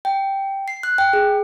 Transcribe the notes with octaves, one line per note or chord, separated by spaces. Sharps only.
G5
C7
F#6
G5
G#4